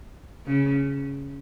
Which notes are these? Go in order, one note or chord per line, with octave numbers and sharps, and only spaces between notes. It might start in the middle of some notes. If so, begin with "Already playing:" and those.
C#3